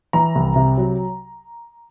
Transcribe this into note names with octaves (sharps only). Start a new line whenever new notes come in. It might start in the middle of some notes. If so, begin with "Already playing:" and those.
E3 A#5
C2
C3
F#3